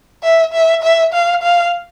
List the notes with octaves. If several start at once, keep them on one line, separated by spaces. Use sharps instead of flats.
E5
E5
E5
F5
F5